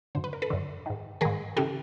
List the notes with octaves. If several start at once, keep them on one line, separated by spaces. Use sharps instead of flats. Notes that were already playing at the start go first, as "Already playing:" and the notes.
F#2 D3 C5
B4
A#4
A4 B4
F#2 D3
G#2 D#3
G#2 D#3 G#4 A#4
C#3 E3 G4 A4